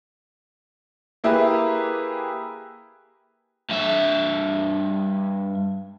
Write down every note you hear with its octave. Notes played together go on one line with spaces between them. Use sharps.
A#3 E4 G4 G#4 B4 E5
G2 E5